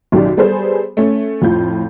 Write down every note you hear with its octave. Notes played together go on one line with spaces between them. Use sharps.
B1 F#2 D#3 G4 D5
G3 B3 G#4 A4 C5
A3 C#4
F2 A2 F4 G6